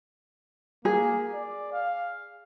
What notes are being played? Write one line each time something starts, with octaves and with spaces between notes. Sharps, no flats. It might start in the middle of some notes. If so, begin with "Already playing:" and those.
A#3 G#4
D5
F5